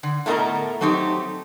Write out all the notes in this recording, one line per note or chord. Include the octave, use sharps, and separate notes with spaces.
D3
A2 A3 B3 A#4 D#5 A#5
F#3 A3 C4 D#4 G4